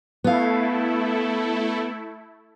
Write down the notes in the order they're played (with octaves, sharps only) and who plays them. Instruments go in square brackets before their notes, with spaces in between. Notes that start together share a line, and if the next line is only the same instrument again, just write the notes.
[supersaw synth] A3 E4 A4 [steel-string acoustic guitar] B3 F5